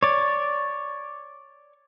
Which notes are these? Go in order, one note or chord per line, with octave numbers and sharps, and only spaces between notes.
C#5 D5